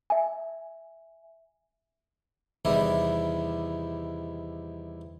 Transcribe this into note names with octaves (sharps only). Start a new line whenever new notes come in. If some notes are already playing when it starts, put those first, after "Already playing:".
E5 G#5
E2 C3 D#3 G3 E4